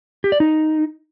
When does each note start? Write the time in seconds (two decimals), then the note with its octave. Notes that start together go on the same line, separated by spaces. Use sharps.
0.24 G4
0.32 D5
0.40 D#4